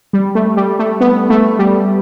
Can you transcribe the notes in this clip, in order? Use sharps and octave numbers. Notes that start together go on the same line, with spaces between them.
G3
A3
G3
A3
B3
A3
G3